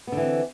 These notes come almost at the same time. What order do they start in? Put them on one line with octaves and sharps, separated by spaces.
B3 D3 E3 C4